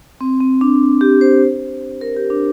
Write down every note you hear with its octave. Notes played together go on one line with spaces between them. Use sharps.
C4
C4
D4
G4
C5
A#4
G4
D4